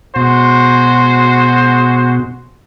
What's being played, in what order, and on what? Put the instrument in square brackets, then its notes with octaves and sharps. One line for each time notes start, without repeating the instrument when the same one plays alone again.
[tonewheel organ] B2 [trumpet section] G#3 F#4 C5